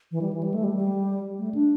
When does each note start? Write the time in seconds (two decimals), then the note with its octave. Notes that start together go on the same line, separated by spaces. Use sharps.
0.11 E3
0.22 G3
0.33 E3
0.43 G3
0.54 A3
0.64 G3
0.75 G3
1.39 A3
1.55 D4